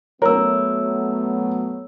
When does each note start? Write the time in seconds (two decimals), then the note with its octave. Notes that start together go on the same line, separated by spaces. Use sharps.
0.22 F#3 A3 B3 A#4 C#5 E6